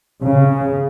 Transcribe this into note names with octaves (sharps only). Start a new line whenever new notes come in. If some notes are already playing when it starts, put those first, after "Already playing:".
C#3